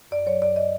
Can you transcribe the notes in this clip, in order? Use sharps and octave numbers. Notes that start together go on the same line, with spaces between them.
F#2 D5
F#3 C#5
F#2 D5
D#5